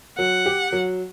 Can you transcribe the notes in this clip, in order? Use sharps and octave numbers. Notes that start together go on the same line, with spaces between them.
F#3 F#5
G4
F#3